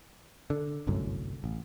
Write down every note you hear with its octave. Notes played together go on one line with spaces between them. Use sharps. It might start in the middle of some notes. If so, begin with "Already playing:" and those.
D3
G1 C2 F#2 A2
A1